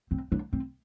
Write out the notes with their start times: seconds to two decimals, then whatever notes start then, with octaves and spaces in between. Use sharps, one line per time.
0.11 C4
0.32 D4
0.53 C4